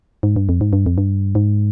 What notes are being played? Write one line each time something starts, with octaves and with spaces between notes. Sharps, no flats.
G#2
G2
F2
G#2
G2
F2
G2
G#2